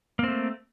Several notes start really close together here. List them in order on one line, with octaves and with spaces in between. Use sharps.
A#3 C4 A3